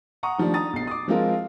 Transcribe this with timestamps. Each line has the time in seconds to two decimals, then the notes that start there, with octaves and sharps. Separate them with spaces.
0.23 F#5 A#5 C#6 D#6
0.38 D#3 F3 G3 A3 D4
0.54 A#5 D#6 A6
0.73 B1 C7
0.87 D6 D#6
1.08 F3 G#3 C4 F4 A#4